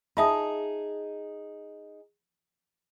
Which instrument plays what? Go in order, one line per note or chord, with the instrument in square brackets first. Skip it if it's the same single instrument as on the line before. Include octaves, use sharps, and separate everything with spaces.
[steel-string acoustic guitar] D#4 G#4 [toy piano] F4 E5 [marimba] D#5 A5 D#6